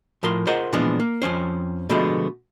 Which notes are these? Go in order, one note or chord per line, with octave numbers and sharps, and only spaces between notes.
A2 F3 A#4 C6
F4 G#4 A#4 C5 D#5 F#5
A#2 E3 F3 G#3 B3 D4
A#3
F2 F3 C#4 C5
B2 D3 F3 G#3 A3 B3